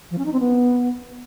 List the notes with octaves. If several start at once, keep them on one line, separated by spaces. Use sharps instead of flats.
F3
C#4
D#4
C4
B3